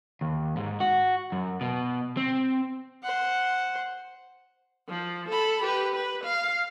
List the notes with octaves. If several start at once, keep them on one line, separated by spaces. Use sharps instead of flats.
D#2
G#2
F#4
F#2
B2
C4
C5 F#5
F3
A4 B5
G4 B4
B4
F5